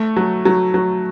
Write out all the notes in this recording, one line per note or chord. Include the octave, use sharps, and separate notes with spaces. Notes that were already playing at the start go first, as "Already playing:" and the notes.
Already playing: A3
F#3
F#3
F#3